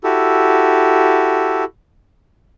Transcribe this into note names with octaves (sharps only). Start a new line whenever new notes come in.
E4 F#4 G4 A4